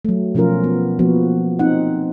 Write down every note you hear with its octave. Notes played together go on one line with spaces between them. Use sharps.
F#3 A3
B2 F3 C#4 F4 A#4
B3
F3 A#3 B3 F#4
C4 D#4 F#5